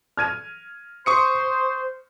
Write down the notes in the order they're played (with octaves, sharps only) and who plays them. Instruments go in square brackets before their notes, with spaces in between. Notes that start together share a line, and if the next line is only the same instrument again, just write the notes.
[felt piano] F6 G#6 D#7
[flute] C5 [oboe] C6 [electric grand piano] C#6 D#6 C#7